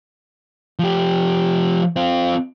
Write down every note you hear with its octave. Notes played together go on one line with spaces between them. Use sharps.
F3 G4
C4 F4